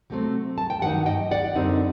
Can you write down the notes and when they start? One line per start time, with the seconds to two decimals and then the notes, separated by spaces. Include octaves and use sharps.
0.10 C3 F#3 A3 C4
0.58 A5
0.70 G5
0.82 G2 D#3 F#3 D#4 F#5
1.06 D#5 G5
1.31 D5 F#5
1.55 F#2 D3 G3 C4 D#4